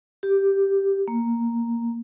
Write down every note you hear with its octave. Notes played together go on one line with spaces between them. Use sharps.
G4
A#3